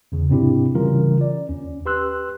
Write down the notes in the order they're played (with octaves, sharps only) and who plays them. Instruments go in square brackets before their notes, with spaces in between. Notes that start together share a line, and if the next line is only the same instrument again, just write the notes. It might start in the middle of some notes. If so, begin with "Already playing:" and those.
[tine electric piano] E2 C#3
G#2 C3 C4 D4 E4 G4
C#3 E3 G3 C#4 F4 A#4
D5
D#2 C#4
G4 B4 C6 E6 F#6